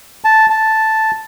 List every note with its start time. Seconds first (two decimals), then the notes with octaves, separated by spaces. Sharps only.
0.24 A5
0.50 A5